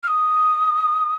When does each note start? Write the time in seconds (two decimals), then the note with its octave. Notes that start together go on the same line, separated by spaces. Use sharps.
0.03 F6
0.07 D#6